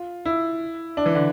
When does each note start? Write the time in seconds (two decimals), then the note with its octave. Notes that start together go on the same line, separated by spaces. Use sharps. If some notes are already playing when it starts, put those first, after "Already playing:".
Already playing: F4
0.25 E4
0.97 D4
1.06 E3
1.15 D3